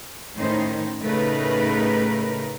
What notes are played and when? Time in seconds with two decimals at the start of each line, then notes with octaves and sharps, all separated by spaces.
0.37 A2 D#3 C#4 D#4 C5
1.02 A2 C#3 A3 D#4 A#4 B4